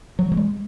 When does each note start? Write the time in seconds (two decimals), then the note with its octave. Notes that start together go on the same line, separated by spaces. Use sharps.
0.19 F#3
0.32 F#3
0.37 G#3